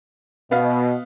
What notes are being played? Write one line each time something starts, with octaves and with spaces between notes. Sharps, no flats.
B2 B3 D#5 F5